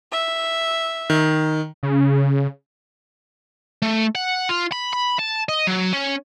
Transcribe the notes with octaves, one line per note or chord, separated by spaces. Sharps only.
E5
D#3
C#3
A3
F#5
F4
B5
B5
A5
D#5
F#3
C#4